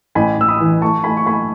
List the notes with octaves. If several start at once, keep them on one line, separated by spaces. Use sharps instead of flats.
A1 G#5 B5
A1 E6
B5 D#6
E3
A3 A5 C#6
A3 G#5 B5
C#6
A3 G#5 B5